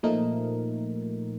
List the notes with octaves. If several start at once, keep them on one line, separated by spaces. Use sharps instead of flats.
A#2 F3 A3 D#4 A#4